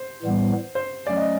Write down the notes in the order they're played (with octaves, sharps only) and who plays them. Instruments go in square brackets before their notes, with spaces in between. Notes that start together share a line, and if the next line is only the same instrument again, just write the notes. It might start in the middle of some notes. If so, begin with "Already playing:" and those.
Already playing: [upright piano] C5
[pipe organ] A2 E3 G3 B3
[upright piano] C5
[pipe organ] F#3 A3 C#4 [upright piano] D5
[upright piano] D#5